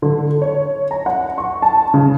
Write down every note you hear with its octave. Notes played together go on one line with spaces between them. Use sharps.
D3
C#5
A#5
F#5
C#6
A5
C#3